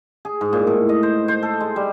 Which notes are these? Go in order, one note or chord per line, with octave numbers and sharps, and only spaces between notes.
G#4
G#2
A#2
A2
D#5
C5
C5
A4
G#3
G3